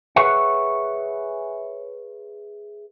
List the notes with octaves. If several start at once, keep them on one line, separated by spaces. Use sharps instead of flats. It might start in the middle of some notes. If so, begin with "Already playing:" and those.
G#4 B4 C#5 E5 F#5